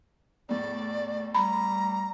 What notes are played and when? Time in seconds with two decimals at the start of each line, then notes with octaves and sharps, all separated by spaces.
0.49 E2 A2 D5
1.34 G3 A#5 B5